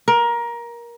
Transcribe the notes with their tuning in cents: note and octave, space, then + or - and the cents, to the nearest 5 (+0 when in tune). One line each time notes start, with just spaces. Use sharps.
A#4 +20